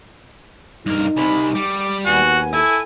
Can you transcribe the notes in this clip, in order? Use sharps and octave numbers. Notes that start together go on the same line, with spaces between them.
G2 D#4 A#4
C2 C3 G#5 B5
G3 D6
D#2 B3 F#4 G#5
E4 A4 G#5